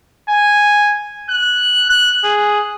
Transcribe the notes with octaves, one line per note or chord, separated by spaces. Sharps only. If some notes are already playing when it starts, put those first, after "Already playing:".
G#5
F#6
F#6
G#4